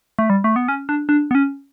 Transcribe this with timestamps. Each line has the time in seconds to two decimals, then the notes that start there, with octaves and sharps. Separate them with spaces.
0.19 A3
0.30 G3
0.44 A3
0.56 B3
0.68 C#4
0.89 D4
1.09 D4
1.31 B3
1.35 C#4